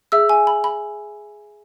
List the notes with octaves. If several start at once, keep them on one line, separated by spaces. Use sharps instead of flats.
G#4 E5 E6
G#5
B5
B5